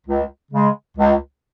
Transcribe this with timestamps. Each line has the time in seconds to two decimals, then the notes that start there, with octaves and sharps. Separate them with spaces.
0.07 C#2
0.51 C#3 G#3
0.97 C#2